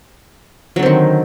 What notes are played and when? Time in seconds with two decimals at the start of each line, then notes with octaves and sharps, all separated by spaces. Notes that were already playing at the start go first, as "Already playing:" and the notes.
0.76 F#3
0.79 D3
0.83 C4
0.86 D#3